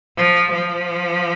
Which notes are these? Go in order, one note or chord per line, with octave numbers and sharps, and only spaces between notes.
F3
F3